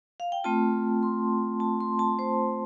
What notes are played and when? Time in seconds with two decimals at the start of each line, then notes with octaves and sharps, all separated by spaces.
0.20 F5
0.32 G5
0.44 A3 C4 F4 A5
1.03 C6
1.60 A5
1.81 C6
1.99 A5
2.19 C5